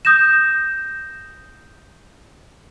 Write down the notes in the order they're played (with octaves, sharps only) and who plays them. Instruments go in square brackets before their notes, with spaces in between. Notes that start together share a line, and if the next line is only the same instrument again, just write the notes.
[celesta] D#6 G6 A#6 E7